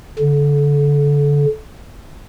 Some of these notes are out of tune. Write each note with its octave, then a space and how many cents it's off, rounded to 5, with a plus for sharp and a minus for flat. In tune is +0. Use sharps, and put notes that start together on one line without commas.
D3 -25